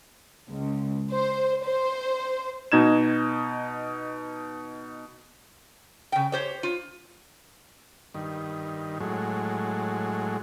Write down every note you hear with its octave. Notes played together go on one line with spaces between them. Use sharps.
C#2
C5
C5
B2 D#4 G#6 E7
C#3 G5
G4 C5 C#5
F4
G2 D#3
A2 F#3 G#3